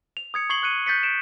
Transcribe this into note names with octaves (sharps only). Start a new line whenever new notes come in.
F7
D#6 G#6 C#7
C#6 G#6 C7 F#7 G7
C#6 F#6 G#6 C#7 D#7
F#6 G6 A6 B6 C#7
D7 E7